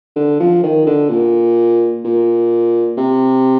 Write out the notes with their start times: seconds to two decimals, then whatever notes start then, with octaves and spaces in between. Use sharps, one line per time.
0.16 D3
0.40 F3
0.63 D#3
0.86 D3
1.10 A#2
2.05 A#2
2.97 C3